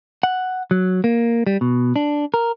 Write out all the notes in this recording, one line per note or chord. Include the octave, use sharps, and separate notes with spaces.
F#5
F#3
A#3
G3
B2
D4
A#4